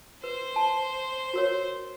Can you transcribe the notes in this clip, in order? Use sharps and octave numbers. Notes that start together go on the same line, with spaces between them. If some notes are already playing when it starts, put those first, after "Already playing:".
B4 C5
A5
F#4 A#4 C#5